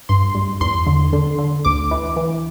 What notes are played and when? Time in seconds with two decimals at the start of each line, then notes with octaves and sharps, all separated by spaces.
0.09 G2 C6
0.35 G2
0.61 E2 C6
0.87 D3
1.13 D3
1.39 D3
1.65 D2 D6
1.91 E3
2.16 E3